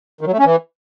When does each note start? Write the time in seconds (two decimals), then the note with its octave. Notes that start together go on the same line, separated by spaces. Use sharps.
0.21 D#3
0.27 F#3
0.33 A3
0.39 C#4
0.45 E3